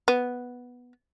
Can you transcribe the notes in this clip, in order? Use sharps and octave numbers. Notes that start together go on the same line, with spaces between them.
B3